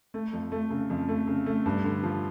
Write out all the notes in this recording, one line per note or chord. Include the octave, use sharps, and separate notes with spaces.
A3
F2
A3
C#3
F2
A3
C#3
A3
G2
D3
F3